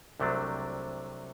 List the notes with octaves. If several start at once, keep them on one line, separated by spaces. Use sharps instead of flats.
C2 C3 F#3 A3 D4